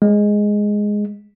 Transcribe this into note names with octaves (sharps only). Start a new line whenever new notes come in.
G#3